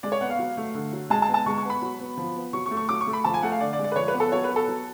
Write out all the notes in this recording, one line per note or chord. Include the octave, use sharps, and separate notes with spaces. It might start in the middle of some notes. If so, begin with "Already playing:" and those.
G#3 D5
C#5
B3 F#5
F5
F#3
A3
D3
F#3
G#3 A5
A5
B3
A5
G#3 C#6
C#6
B3
B5
F#3
B3
F3
B3
F#3 C#6
C#6
A3
C#6
F#3 D6
C#6
A3
B5
F3 A5
G#5
A3 F#5
F5
D3 D5
D5
G#3
D5
B4
F3 C#5
B4
B3
A4
F#3 C#5
B4
B3
A4
F#3